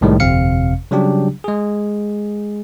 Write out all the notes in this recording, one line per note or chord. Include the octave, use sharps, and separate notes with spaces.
C2 A2 D#3 G3 G#3
G1 F2 C3 C4 F5 C#7
C#3 F#3 G3 D4 G4
G#3 G#4